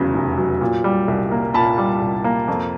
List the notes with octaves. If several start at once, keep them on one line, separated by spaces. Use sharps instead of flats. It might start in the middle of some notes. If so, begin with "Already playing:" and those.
Already playing: F1 E2 C#3 F#3
F1
F#3
A#2
G3
C2
A#3
A#2 A5 B5
G3
C2
A#3
F2